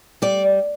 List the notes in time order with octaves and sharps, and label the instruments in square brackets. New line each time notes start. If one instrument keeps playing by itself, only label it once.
[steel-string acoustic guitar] G3 D5